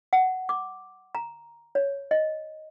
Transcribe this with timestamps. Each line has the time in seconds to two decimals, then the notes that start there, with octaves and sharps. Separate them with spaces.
0.13 F#5
0.49 D6
1.15 A#5
1.75 C#5
2.11 D#5